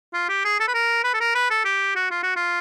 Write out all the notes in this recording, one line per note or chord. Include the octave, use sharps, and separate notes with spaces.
F4
G4
G#4
A4
B4
A#4
B4
A4
A#4
B4
A4
G4
F#4
F4
F#4
F4